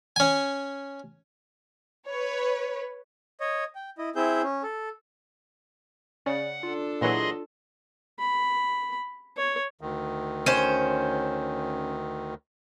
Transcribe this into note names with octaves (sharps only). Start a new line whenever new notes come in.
C#4 G#5
B4 C#5
C#5 D#5
G5
E4 D#5
C4 E4 G#4 E5 G6
C#4
A4
C#3 D5 F#5
D4 F4 A4
A#2 E3 F#3 G#4 D#5 C6
B5
C#5
D2 D#3
C#4 C5